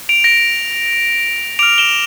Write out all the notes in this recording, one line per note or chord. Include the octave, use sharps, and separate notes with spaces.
D7 F7
A#6 D7
D6 F6 D7 F7
E7 G7